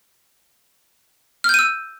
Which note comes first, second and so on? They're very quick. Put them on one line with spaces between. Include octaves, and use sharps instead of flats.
F6 G6 D#7 E6